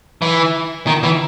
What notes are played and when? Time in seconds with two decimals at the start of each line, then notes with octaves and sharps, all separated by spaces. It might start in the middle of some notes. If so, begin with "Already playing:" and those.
0.22 E3
0.87 D#3
1.03 E3